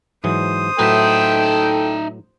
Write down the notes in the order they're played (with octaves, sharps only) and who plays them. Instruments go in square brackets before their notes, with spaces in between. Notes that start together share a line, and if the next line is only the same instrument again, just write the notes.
[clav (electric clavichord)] G#2 E3 F#3 [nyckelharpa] C5 D#6
[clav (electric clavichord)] A2 F#3 B4 [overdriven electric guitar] D#4 E5 [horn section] A4 G5